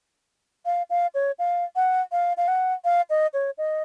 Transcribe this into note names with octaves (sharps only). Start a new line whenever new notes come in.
F5
F5
C#5
F5
F#5
F5
F5
F#5
F5
D#5
C#5
D#5